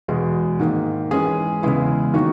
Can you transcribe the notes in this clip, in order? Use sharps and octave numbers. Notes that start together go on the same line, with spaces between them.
E2 B2 G#3
G#2 D#3 A#3
E3 G#3 C#4 G#4
E2 C#3 G#3 B3 E4
D#3 A#3 D#4 F#4